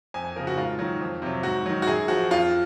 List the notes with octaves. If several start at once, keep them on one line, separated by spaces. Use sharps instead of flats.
F2 G#5
G#5
C#3 F3 A#4
F#4
G#2 F4
D#3 F#3
F2
C3 F#3
G#2 F#4
D#3 F#3
F#4
F#2 G#4
F3 F#4
F2 F4